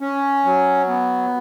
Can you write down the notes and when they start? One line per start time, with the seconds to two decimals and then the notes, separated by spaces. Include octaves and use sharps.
0.01 C#4
0.45 F#3
0.88 B3